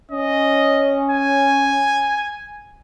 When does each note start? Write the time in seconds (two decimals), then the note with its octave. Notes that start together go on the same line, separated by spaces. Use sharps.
0.11 C#4 D#5
1.11 G#5